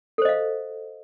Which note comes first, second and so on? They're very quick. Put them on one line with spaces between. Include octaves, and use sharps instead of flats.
A4 C5 D#5 F5